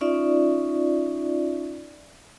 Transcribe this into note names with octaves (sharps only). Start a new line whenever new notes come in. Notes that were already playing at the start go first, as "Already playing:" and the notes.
C#4 D#4 F4 D5 E5